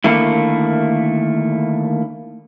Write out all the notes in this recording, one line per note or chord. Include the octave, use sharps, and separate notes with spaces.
D3 D#3 A3 A#3 E4